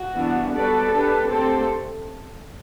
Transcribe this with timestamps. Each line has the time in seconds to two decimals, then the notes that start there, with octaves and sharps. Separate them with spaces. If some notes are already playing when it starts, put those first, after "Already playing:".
Already playing: F#4
0.15 E3 G3 B3 D4
0.53 G3 B3 F#4 A4 B4 D5
0.91 B3 D4 G4 B4
1.29 D3 A3 C4 G4 A4 C5